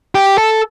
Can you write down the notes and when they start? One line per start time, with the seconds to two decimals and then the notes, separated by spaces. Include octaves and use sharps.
0.15 G4
0.38 A4